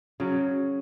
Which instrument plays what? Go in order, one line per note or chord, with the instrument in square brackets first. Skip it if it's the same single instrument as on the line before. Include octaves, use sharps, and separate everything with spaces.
[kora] C#3 F#3